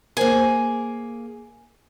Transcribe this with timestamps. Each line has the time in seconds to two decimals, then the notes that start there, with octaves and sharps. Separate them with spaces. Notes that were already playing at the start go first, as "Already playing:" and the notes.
0.17 A#3 G#4 A#4 C5 G#5